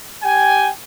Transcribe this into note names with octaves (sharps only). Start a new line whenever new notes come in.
G4 G5 G#5